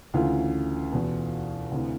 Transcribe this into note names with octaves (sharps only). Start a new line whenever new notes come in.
D2 C#3 E3 F4
E2 B2
D2 C3 E3